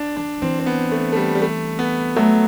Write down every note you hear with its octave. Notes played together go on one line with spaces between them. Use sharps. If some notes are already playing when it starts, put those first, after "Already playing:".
Already playing: D4
E3 D4
E3 C4
C4
B3
A3
A3
G3
G3
A3
B3
F#3 A3